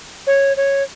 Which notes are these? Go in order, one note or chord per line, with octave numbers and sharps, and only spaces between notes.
C#5
C#5